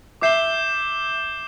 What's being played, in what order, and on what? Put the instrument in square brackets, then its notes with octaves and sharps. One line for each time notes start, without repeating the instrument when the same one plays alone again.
[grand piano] E5 [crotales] D6 G6 C7 E7 G7